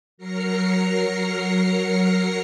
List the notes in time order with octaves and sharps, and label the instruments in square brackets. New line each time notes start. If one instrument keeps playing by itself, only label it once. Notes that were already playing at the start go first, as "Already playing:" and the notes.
[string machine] F#3 A#4 F6 A#6 C7 C#7